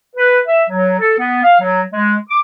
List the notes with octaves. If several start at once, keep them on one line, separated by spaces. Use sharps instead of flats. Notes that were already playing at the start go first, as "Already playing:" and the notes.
B4
E5
F#3
A4
B3
F5
F#3
G#3
D6